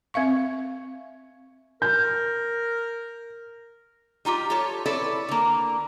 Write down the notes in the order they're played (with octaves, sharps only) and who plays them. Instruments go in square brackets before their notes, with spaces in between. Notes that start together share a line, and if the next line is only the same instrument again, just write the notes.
[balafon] C4 E5 F5 C#6
[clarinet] A#4 [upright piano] G6
[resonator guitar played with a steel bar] G3 D#4 F4 G4
F4 G4 A4 C#5
E4 A4 B4 C#5 D5
D3 A#3